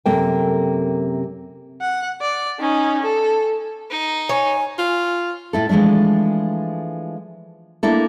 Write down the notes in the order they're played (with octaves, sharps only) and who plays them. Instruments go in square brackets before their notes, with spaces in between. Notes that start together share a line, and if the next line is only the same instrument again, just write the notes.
[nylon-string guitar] F#2 C3 A#3 A4 A#4 G5
[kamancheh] F#5
D5
C#4 D#4
A4
[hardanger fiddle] D#4
[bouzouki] C#5 [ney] G#5
[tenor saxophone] F4
[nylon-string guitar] A2 E4 A4
E3 F3 G#3 A3 D4
A3 A#3 D4 E4 A4